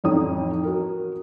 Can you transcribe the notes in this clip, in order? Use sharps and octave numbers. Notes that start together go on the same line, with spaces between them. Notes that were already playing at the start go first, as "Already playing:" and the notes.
A1 F2 D#4 C#5 D#6
F#4 A#4